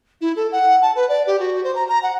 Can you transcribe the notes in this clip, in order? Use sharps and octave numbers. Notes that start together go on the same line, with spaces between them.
E4
A4
F#5
A5
B4
D5
G4
F#4
C5
A#5
A#5
F#5